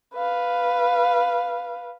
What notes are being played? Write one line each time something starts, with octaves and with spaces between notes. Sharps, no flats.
B4 F5